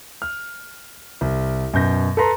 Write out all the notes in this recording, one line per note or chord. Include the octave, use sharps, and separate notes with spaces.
F6
C2
F#2 B2 G6 A#6
A4 B4 A#5 C6